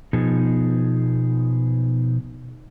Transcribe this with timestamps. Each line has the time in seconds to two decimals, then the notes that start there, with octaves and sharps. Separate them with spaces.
0.13 B2 F3 B3 D#4 G#4